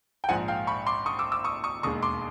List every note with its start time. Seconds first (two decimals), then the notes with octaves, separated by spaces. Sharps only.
0.24 G5
0.29 A#1 G#2 F3 F#5 G#5
0.48 F5 G5
0.67 B5 C#6
0.87 C6 D6
1.06 C#6 D#6
1.19 D6 E6
1.32 D6 E6
1.44 C#6 D#6
1.64 C#6 D#6
1.83 E1 D#2 D#3 G#3 C#6 D#6
2.02 C6 D6